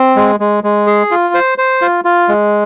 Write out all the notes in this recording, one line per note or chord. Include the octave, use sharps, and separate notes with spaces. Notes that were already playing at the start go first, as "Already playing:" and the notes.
Already playing: C4
G#3
G#3
G#3
G#4
F4
C5
C5
F4
F4
G#3